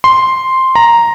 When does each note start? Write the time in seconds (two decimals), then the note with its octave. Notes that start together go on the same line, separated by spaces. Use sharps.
0.04 C6
0.75 A#5